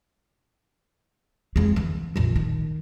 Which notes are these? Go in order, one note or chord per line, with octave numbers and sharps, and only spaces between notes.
F2 G#3
D3 E3
A#1 F2
D#3